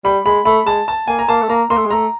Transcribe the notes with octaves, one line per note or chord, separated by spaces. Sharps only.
G3 B5
G#3 B5
A3 B5
G#3 A5
A5
A#3 G#5
A#5
A#3 A5
A3
A#3 A#5
A#3 C6
A3
G#3
A3 A#5